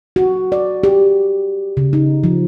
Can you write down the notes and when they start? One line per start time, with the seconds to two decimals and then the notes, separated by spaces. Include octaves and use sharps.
0.16 F#4
0.52 D5
0.83 G4
1.77 C#3
1.93 D#4
2.24 F3